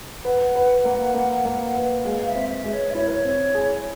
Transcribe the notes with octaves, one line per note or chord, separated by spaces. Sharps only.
B4 F#5
B4
A#3
A#3
A#3
B4
G#3 F5
E5
C4
E5
G#3
C#5
E5
E4 C#5
A#4
C#5
C4
G#4